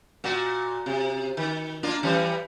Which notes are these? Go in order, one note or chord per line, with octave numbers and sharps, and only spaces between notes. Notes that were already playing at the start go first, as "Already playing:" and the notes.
A#2 F#4
C3
D#3
A#3 D4 F4
E3 G3 C#4